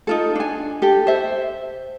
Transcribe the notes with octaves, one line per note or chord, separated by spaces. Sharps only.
D#4 F4 A4
D4 G#5
G4 A4
C5 E5